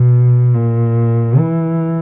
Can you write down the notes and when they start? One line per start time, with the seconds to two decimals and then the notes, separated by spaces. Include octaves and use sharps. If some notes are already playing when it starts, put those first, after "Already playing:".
Already playing: B2
0.55 A#2
1.38 E3